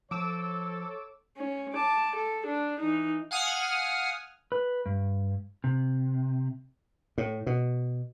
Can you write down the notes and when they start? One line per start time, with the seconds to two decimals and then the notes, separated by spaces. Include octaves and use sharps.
0.11 F3 A4 C#5 D6 E6
1.37 C#4
1.73 A5 D6
2.16 A4
2.46 D4
2.79 E3 D#4
3.31 F5 F#5 G#5 D#6 F6
4.52 B4
4.86 G2
5.64 C3
7.18 A2
7.47 B2